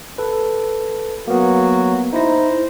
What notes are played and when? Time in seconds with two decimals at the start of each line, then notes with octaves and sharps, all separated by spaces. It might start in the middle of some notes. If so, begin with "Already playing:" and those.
0.18 A4 B4
1.28 F#3 A#3 B3 F#4
2.13 D#4 E4 C5 A#6